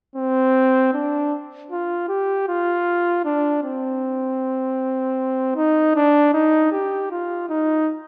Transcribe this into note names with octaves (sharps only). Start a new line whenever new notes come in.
C4
D4
F4
G4
F4
D4
C4
D#4
D4
D#4
G4
F4
D#4